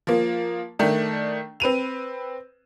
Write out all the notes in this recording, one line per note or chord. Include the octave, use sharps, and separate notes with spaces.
F3 A#3
D#3 A3 D4
C4 B4 D#7 F7